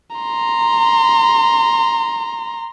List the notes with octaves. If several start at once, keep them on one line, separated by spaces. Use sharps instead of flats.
A#5 C6